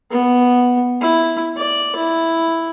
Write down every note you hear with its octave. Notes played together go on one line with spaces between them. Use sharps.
B3
E4
D5
E4